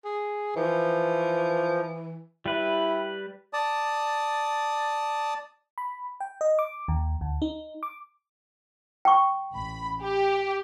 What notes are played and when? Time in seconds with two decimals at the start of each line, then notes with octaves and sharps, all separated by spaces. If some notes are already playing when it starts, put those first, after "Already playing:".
0.05 G#4
0.56 E3 F3
2.46 G3 E4 B4
3.53 D5 A5 D#6
5.78 B5
6.20 G5
6.41 D#5
6.59 D6
6.88 D#2
7.21 D2
7.42 D#4
7.83 D6
9.05 G5 C#6
9.51 A1 B5
10.03 G4